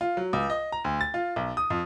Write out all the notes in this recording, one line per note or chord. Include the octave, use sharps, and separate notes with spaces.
F4
F#3
C#2
D#5
A#5
D2
A6
F4
B1
D#6
F2